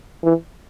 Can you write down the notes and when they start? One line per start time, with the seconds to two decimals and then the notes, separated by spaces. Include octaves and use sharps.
0.24 E3